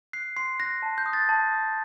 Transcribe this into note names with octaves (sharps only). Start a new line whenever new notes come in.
F#6 C7
C6 C7
F#6 A#6
A5
G6
D#6 F#6
A6
A5
D#6 F#6